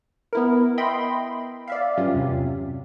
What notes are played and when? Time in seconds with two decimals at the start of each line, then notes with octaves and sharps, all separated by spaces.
0.33 B3 E4 A#4
0.78 D#5 E5 G5 B5 C6
1.68 D5 E5 F5
1.98 G2 F#3 C#4 F4 G4
2.14 E2 C3